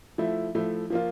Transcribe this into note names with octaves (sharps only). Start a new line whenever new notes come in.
F3 A3 E4
F3 A3 E4
F3 A#3 F4